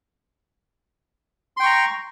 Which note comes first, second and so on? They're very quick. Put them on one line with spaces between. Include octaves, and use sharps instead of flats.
C6 G5 C#6 A#5